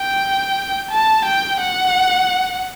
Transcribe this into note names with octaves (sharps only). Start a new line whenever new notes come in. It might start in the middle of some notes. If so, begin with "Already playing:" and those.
Already playing: G5
A5
G5
F#5